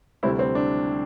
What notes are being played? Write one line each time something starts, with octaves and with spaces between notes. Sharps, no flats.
D2 C3 G3 C4 E4
C4
D4